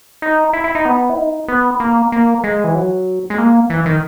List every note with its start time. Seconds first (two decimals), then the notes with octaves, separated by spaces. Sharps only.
0.22 D#4
0.53 E4
0.64 E4
0.75 D#4
0.85 B3
1.10 E4
1.18 D#4
1.48 B3
1.80 A#3
2.12 A#3
2.44 G#3
2.64 E3
2.75 F#3
3.30 G#3
3.38 A#3
3.70 E3
3.86 D#3